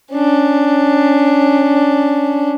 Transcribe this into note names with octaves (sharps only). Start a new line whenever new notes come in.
C#4 D4